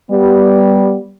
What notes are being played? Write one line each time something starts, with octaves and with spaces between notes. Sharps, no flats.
G3 B3